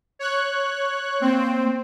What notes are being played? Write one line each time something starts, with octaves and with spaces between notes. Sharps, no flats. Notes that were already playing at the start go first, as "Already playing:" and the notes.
C#5 F#6
A#3 C4